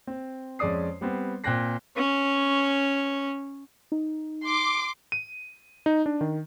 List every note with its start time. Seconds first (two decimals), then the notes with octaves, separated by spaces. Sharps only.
0.07 C4
0.59 F2 G#3 C#4 D5 D#6 C7
1.01 G3 B3 C4
1.44 A#2 C4 G5 F#6 A#6 C7
1.97 C#4 C#5
3.92 D#4
4.44 C6 D6
5.12 D#7
5.86 D#4
6.06 D4
6.21 D#3